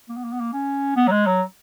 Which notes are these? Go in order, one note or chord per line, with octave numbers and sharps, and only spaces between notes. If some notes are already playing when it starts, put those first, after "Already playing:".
A#3
B3
A#3
B3
A#3
C#4
B3
F#3
G#3
F#3